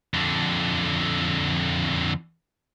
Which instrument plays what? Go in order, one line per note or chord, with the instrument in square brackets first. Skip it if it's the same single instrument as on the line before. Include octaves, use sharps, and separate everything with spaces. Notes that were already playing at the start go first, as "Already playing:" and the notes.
[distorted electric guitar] F2 D3